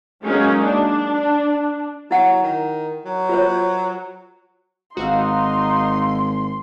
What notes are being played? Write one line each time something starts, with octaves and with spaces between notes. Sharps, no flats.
F#3 G#3 A#3 C#4 D#4
D4
F#3 E4 F#5
D#3
F#3
F4 C5 C#5
G#1 D#4 F#4 F5 C6 E6